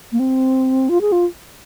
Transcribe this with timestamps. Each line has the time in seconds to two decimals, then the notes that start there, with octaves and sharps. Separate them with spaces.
0.12 A#3
0.19 C4
0.89 F4
1.01 G#4
1.12 F4